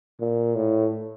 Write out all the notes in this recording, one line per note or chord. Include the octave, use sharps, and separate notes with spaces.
A#2
A2